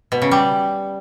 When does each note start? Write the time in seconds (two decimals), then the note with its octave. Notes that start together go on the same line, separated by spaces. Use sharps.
0.12 B2
0.22 C#3
0.31 G3